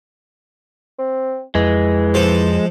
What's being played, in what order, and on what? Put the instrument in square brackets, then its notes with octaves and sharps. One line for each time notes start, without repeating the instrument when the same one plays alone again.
[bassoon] C4
[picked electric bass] F2 [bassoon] E3 [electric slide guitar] G#3
[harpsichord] F3 A4